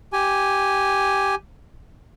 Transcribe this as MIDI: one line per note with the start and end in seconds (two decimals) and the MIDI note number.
0.13 1.35 67
0.13 1.35 80